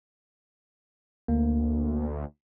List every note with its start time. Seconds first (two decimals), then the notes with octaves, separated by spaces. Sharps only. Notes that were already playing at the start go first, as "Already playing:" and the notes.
1.28 D2 A#3